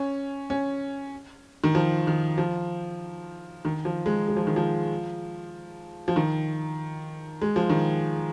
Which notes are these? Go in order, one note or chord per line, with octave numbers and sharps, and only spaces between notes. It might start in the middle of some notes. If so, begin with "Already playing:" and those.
Already playing: C#4
C#4
D#3
F3
D#3
F3
D#3
F3
G#3
G#3
F3
D#3
F3
F3
D#3
G#3
F3
D#3